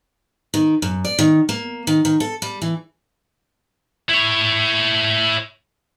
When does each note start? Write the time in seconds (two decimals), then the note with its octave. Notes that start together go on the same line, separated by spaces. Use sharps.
0.54 D#3
0.82 F#2
1.05 D5
1.19 D#3
1.49 A#3
1.87 D#3
2.05 D#3
2.20 A4
2.42 G3
2.62 E3
4.10 E4 C#5